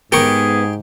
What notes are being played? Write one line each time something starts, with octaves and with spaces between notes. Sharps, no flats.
G#2 B3 G4 G#4 A#4 C#6